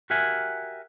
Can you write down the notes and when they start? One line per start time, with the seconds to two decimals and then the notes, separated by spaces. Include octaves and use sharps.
0.10 F#4 G4 A#4 E5 F#5 G#5